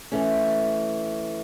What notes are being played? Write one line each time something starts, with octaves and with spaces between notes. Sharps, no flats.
E3 A3 C#4